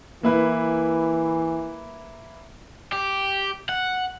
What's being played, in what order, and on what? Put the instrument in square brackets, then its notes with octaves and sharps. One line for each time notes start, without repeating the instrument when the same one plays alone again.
[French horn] E3 [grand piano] A#3 E4 B4
[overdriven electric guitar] G4
F#5